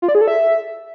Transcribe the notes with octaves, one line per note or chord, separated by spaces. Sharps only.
F4
D5
G#4
A4
E5